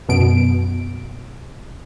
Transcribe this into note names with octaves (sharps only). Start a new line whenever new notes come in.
F#2 B2 D7